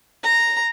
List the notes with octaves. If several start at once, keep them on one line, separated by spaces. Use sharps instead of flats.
A#5